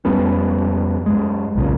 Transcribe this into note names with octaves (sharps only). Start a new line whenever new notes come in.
F2 G3 B3 C#4
F#2 G#3
B1 E2 A#2 C#3